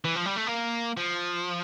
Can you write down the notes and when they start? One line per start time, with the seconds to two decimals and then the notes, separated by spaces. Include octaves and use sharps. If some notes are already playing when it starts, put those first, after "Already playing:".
0.05 E3
0.16 F3
0.26 G3
0.37 A3
0.47 A#3
0.97 F3